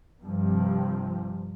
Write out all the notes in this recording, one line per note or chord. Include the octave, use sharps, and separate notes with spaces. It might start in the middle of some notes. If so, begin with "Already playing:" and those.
G2 C3 F3